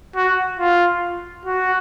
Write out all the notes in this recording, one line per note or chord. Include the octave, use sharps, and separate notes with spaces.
F#4
F4
F#4